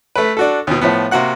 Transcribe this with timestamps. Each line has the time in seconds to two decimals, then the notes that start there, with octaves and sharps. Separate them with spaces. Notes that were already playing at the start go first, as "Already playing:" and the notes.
0.16 A3 B4
0.37 D4 F#4 A4
0.67 D#2 B2
0.81 A2 F3 B3
1.11 C3 A#3 F#4 F#5 F#6